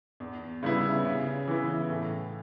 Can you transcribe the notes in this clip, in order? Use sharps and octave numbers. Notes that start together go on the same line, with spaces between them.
E2
C#3 G3 B3 E4
C#3
E3 B3 E4
A2